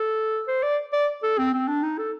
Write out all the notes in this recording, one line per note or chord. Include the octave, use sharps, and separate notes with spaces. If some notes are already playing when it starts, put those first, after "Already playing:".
Already playing: A4
C5
D5
D5
A4
C4
C4
D4
D#4
A4